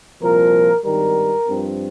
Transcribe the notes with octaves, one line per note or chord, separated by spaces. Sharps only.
C2 A#2 F3 A#4
G#1 G2 D#3 G3 A#4
G2 F3 C4